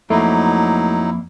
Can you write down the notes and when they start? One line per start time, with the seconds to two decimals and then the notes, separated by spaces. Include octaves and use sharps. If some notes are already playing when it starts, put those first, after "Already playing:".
0.10 F2 F#3 A3 A#3 D#4 E4